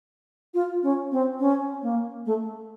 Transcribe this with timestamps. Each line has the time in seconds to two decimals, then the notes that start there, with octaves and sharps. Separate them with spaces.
0.54 F4
0.83 C#4
1.11 C4
1.39 C#4
1.82 A#3
2.26 A3